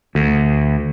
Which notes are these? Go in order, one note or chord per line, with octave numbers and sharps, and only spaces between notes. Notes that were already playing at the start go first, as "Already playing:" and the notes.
D2